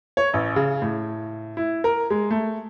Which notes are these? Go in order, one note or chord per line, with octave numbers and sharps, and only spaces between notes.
C#5
A1
C#3
A2
E4
A#4
G#3
A3